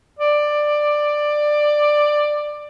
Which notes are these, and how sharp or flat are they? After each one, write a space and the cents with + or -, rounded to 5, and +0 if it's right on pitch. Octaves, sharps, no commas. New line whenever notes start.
D5 +15